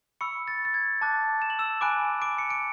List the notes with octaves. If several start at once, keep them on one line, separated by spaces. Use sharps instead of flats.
B5 C#6 E6 C#7
A6
A6
G#6
A5 D6 F#6 A6
E7
F#7
E6 E7
G#5 B5 D6 F#6 D7
D6 D7
C#7
D7